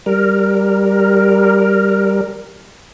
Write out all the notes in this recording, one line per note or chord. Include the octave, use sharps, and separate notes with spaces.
G3 A#4